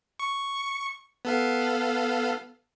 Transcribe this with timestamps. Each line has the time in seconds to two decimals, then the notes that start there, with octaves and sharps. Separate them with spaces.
0.19 C#6
1.25 B3 A4 F5